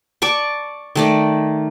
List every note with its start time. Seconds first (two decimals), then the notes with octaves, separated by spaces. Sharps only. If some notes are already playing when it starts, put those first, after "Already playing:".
0.22 D5 A5 C#6 D6
0.95 D#3 A3 D5